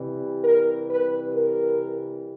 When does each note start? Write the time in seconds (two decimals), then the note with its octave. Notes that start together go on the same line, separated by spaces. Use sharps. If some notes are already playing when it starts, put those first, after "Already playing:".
Already playing: C3 E3 G3
0.44 A#4
0.89 B4
1.35 A#4